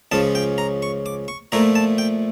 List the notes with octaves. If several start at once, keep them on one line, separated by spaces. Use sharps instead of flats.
C#2 C#3 F3 C#4 A5
G5
A#5
C#6
D6
C#6
A#2 F3 A3 E4 A#5
A5
G5